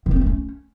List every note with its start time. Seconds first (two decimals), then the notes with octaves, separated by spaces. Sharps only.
0.06 D#3
0.11 C4
0.16 A#3
0.21 A3
0.26 C#4